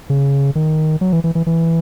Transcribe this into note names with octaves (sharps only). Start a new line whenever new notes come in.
C#3
D#3
F#3
E3
E3
E3
E3